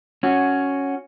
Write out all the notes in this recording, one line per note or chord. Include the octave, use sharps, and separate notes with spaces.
C#4 F#4